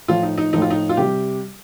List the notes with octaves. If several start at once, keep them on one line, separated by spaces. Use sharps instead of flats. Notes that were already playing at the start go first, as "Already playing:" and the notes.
A2 F3 F4
D#4
D#4
A2 F3 D#4
F4
D#4
F4
C3 G3 G4